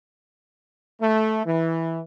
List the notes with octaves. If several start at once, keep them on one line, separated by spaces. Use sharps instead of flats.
A3
E3